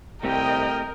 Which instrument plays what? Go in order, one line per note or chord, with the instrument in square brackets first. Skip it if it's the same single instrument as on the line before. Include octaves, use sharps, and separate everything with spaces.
[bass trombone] C2 [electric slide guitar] A3 C4 G4 [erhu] A#4 [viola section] D#5 G5